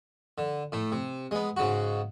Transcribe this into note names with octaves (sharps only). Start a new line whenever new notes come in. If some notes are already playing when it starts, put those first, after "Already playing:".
D3
A2 A3
C3
G#3 B3
G#2 C#3 F#4